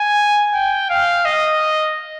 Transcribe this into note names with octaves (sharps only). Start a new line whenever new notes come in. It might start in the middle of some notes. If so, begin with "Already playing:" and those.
Already playing: G#5
G5
F5
D#5